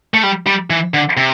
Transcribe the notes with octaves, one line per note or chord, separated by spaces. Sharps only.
A3
G3
G3
E3
D3
C3